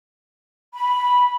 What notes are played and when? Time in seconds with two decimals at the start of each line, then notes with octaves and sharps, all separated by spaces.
0.74 B5